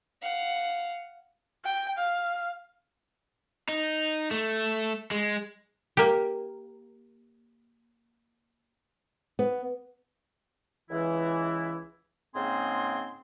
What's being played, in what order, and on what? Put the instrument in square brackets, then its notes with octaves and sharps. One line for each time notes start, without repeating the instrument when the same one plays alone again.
[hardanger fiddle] F5 F#5
[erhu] G5
F5
[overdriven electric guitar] D#4
A3
G#3
[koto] A#3 G4
[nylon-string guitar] B3
[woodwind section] C#2 E3 E4
G#2 C#3 A#3 C4 G#4 C6